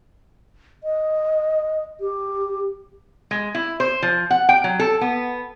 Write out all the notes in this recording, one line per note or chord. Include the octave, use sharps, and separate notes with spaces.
D#5
G4
G#3
E4
C5
F3
F#5
G5
F#3
A4
B3